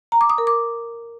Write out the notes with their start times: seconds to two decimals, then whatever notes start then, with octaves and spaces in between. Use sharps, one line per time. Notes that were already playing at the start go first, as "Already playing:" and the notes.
0.12 A#5
0.21 D6
0.30 D#6
0.38 A#4
0.47 D6